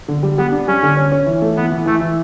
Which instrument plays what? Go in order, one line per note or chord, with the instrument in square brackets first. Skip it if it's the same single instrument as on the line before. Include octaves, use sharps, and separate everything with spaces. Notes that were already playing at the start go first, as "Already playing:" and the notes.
[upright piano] D3
G3
[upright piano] G3 [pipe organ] B3
[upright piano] D4
[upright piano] G3 [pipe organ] C#4
[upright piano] D3
C#4
C#4
E3
A3
[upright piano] E3 [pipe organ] B3
[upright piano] E3
[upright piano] E3 [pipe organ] A3
[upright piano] E3